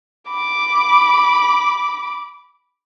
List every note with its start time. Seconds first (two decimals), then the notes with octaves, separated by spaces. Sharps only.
0.30 B5 D6